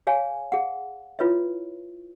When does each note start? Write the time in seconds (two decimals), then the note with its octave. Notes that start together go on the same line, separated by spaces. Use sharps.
0.07 G#4 C#5 F5 G#5
0.52 G#4 F5 F#5
1.19 E4 F4 B4 C#5 E5